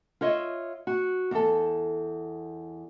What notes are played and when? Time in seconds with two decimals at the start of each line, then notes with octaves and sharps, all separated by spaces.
0.21 F4 C#5 D#5 E5
0.87 F#4
1.31 E2 A4